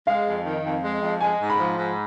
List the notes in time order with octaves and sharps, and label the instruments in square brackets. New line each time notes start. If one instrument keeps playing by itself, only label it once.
[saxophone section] G#3 [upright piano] F5
[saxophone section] F2
D#3
F2
G#3
F2
[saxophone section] G#3 [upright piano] G#5
[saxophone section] G#2
[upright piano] B5
[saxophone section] F3
G#2